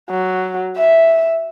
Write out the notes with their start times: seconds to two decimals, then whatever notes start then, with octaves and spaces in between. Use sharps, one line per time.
0.10 F#3
0.77 E5